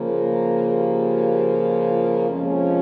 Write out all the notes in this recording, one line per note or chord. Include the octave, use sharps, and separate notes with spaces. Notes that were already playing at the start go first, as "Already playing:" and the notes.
Already playing: C#3 F3 A#3 A#4
G4
F4
F4
F2 C3 F3 G#3 C#4